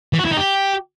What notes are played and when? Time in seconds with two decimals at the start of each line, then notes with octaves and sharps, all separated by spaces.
0.13 E3
0.19 F#4
0.25 E4
0.31 D#4
0.37 G4